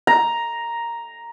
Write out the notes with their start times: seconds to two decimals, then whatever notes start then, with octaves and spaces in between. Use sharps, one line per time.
0.07 A#5